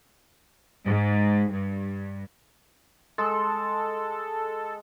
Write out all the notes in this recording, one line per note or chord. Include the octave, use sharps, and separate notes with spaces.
G#2
G2
G#3 A4